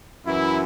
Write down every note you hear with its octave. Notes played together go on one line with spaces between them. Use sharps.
F#2 E3 E4